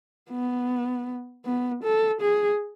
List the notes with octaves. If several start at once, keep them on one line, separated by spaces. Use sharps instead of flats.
B3
B3
A4
G#4